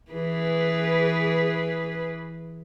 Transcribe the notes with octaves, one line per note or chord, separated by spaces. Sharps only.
E3 G#4 B4